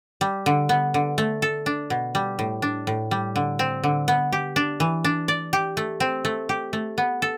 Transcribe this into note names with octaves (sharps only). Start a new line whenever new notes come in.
G3
D3
B3
D3
A3
A4
D4
B2
G3
A2
D4
A2
G3
D3
C4
D3
B3
G4
D4
E3
D4
D5
G4
A3
C4
A3
G4
A3
B3
A4